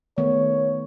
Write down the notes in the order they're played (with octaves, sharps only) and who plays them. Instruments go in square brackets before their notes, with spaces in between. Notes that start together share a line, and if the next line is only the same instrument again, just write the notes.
[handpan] D#3 A3 B3 [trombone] C#5